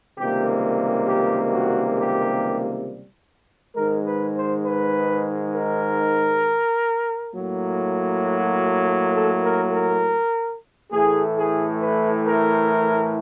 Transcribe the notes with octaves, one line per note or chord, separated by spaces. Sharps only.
C#2 C3 D#3 G3 A#3 G4
G4
F#4
G4
G#2 D#3 G#3 A#4
B4
C5
B4
A#4
A2 F#3 A#3
F#4
A4
A#4
A#4
A2 E3 A3 G#4
G#4
B4
A#4